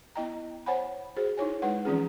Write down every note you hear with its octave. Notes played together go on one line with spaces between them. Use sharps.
B3 E4 D#5 G5 A#5
C5 C#5 F#5 G#5 B5
F#4 G#4 C5
D#4 E4 C#5 G#5
G#3 D#4 B4 F#5
E3 F3 C4 C#4 F4 G#4